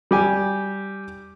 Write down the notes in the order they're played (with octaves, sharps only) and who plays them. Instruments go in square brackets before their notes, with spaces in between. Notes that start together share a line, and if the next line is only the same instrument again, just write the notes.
[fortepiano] G3 G4 G#5